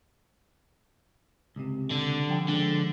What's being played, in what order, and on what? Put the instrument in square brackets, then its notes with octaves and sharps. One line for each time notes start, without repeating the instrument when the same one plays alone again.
[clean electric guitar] C#2 C3
[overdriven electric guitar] D3
[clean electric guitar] F3 G5
[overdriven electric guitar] D3 [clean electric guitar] F3 G#3